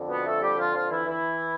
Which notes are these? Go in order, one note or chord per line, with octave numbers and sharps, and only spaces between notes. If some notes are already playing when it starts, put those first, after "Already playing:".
Already playing: F2 D3
B2 B3
A3 A4
G3 G4
F3 F4
F3 F4
E3 E4
E3 E4